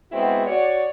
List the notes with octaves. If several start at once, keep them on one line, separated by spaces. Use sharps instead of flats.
G#3 B3 C4 E4 F#4 G#4
F#4 C#5 D5